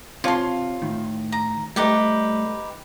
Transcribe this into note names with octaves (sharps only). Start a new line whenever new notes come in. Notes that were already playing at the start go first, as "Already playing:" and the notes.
C3 F4 C#5 A5 C6
A2 D#3
A#5
G3 A3 D#4 G4 B4